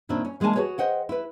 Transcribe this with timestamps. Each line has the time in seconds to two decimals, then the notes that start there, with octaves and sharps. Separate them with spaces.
0.09 A#2 D#3 C4 D4 E4
0.25 C#4
0.40 E3 G#3 A#3 D4 G#5 A5
0.56 F#4 G#4 B4 C#5
0.78 C5 D#5 F#5 G5
1.09 E4 B4